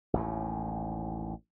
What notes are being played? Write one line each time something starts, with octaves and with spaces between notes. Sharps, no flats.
A1 D#2 A2